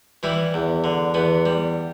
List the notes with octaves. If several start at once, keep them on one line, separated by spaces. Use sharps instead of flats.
E3 G3 E4
E2
D3
E2 B3
G3